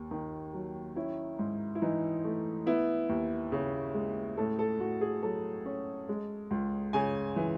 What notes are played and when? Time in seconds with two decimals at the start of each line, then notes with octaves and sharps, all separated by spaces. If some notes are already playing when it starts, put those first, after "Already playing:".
Already playing: D#2
0.11 D#3
0.53 F#3
0.96 C#4 E4
1.39 G#2
1.75 E4
1.82 E3 D#4
2.24 A3
2.66 B3 E4
3.09 D#2
3.52 C#3
3.94 G#3
4.37 A2 A4
4.59 A4
4.80 A2 F#4
5.01 G#4
5.23 F#3 A4
5.65 C#4
6.09 G#3
6.51 C#2
6.93 C#3 G#5
7.36 E3